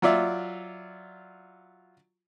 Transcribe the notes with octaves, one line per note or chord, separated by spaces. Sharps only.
F#3 F4 D5 E5